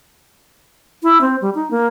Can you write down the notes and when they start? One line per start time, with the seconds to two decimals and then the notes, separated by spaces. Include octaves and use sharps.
1.03 E4
1.21 C4
1.42 G3
1.55 D#4
1.71 A#3